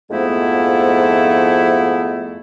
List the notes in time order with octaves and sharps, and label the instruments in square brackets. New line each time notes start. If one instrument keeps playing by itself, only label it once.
[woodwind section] F2 G#2 F3 A3 B3 E4